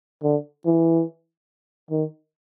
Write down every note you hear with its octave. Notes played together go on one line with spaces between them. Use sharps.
D3
E3
D#3